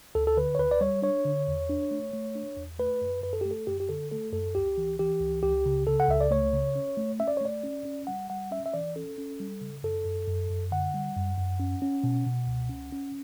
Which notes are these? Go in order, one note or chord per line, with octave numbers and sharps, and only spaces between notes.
D2 A4
A4
D3 B4
C#5
D2 B4
D5
G3 C#5
D4 C#5
D3
E2
D4
A3
A3
D4
E2
A3 B4
F#2
F#2 B4
A4
A3 G4
A4
F#2 G4
G4
D3 A4
A3 A4
F#2 A4
C#2 G4
E3
E3 G4
C#2
C#2 G4
C#3
C#3 A4
F#5
C#2 E5
D5
A3 C#5
C#3
C#4
A3
C#4 E5
D5
C#5
A3 D5
C#4
C#4
G3 F#5
G3 F#5
C#4 E5
E5
E3 D5
C#4 A4
C#4
G3
C#3
F#2 A4
F#2
F#2
F#2
D3 F#5
G3
F#2
F#2
C#4
C#4
B2
B2
C#2
C#4
C#4